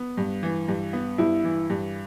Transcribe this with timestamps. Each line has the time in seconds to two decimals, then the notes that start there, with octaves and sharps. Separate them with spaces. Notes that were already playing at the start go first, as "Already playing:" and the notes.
Already playing: B3
0.17 G2
0.43 E3
0.68 G2
0.93 B3
1.18 G2 E4
1.44 E3
1.70 G2